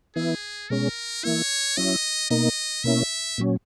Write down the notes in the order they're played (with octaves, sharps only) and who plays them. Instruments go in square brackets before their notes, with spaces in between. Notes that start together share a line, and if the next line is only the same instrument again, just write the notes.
[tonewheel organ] E3 B3 E4 [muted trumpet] G#4
[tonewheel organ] B2 G#3 C#4 [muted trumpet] A#4
[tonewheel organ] E3 A#3 E4 [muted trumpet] C#5
[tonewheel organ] F#3 C#4 E4 [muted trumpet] D#5
[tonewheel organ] B2 A#3 D#4 [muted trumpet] D#5
[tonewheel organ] B2 A#3 C#4 E4 [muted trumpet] E5
[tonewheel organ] A#2 F#3 C#4